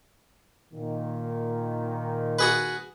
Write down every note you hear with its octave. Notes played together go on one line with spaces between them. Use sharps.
A#2 D#3
F#4 G#4 B4